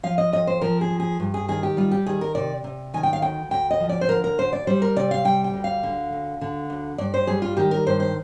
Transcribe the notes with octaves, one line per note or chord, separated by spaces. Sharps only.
F3 F5
D#5
F2 D#5
C5
F3 A#4
G#4
F2
G#4
G2
G#4
D#3 G#4
G4
G3 F4
G4
D#3 G#4
A#4
C3 D5
C3
D#3 G#5
G5
F5
D2 G5
D2 G5
D#5
F3
D5
C5
D3 A#4
A#4
D2 C5
D5
G3 C5
A#4
C3 D5
F5
G3 G5
G5
D2
F5
D3
D2
D3
D2
G2 D5
C5
G3 G#4
F4
D#3 G4
A#4
G2 C5
C5